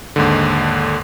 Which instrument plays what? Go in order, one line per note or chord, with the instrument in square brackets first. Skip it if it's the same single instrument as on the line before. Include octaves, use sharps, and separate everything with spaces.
[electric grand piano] D#2 G#2 D3